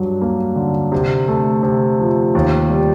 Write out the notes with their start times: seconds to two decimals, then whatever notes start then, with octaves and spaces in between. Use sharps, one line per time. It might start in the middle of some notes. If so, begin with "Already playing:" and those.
Already playing: G2 F#3
0.21 A#3
0.56 D3
0.92 C3
1.28 A3
1.63 C3
2.00 F3
2.35 D#2
2.70 G3